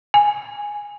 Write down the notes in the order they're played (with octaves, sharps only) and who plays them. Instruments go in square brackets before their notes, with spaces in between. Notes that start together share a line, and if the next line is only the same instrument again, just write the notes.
[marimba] G#5